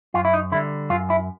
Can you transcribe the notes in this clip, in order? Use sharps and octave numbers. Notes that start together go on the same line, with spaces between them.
F#2 F4
E4
D#4
D3 G3 E4
F#2 F4
E4